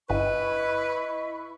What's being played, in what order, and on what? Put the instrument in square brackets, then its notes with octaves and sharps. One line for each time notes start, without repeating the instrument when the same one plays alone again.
[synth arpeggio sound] G1 [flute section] E4 B5 C#6 [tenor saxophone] B4 [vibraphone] D#5